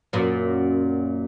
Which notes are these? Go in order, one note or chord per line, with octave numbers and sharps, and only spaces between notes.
F#2 A#2